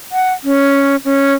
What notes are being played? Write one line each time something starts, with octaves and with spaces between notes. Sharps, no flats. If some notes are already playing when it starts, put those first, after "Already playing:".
F#5
C#4
C#4